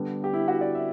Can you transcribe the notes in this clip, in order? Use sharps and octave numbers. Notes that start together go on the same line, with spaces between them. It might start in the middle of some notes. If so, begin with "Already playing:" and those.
Already playing: D3 G3 B3 D4
G4
E4
F#4
D5
E5